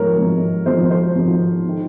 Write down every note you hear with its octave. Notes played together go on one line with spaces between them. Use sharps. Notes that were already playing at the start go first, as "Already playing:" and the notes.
Already playing: G#2 F3 A#4 C#5
G#1 G#2 F3
G#1 G#2 F3 C5
C5
G#1 G#2 F3
D#3